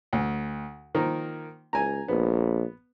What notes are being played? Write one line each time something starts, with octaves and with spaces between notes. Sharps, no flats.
D2
D#3 F3 A#3
C#2 G#5 A#5
A#1 B3